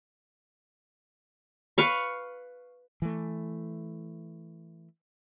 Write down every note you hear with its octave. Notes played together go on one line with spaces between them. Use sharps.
B4 F5 C#6
E3 A3